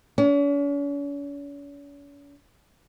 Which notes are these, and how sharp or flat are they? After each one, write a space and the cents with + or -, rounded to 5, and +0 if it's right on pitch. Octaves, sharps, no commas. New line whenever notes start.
C#4 +45